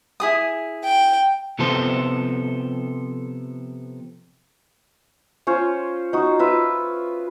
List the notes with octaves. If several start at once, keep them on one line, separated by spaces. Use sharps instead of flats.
E4 G#4 D#6
G5
C3 F3 B3 A4 C5
C#4 F4 C5 C#5
D#4 F#4
F4 B4 E5